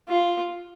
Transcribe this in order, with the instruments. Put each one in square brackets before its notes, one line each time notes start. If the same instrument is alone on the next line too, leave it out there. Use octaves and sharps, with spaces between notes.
[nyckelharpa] F4